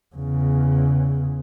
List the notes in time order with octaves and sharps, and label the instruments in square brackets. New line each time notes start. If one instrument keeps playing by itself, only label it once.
[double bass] E2 C#3